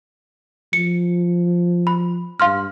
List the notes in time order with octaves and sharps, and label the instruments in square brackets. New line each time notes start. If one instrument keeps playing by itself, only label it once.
[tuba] F3 [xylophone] C#7
[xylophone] B5
[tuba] G2 [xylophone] F5 C6 F6